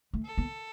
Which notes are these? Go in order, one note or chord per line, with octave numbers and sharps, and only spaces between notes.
A3
A4
B3